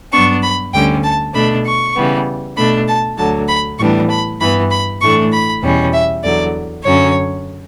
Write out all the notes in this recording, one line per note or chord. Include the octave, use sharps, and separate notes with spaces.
G2 F#3 B3 D4 C#6
B5
D2 D3 G3 C#4 G5
A5
B2 A3 D4 B5
C#6
C#3 E3 G3 B3
B2 A3 D4 B5
A5
D2 D3 F#3 A5
B5
A2 E3 G3 B3 D4 C#6
B5
G2 E3 B3 B5
B5
A2 E3 A3 D4 C#6
B5
E2 B2 G3 C#4
E5
E2 D3 F#3 D5
F#2 D3 F#3 C#4 C#5